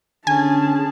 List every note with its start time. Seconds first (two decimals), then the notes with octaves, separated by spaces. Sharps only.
0.27 D3 C#4 G#4 G#5 A5